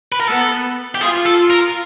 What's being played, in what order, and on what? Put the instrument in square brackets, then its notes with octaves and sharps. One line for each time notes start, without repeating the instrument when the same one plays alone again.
[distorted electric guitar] B4
A#4
[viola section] B3 [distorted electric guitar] A4
[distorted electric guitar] G4
[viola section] F4 [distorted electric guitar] G#4
[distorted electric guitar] A4
A#4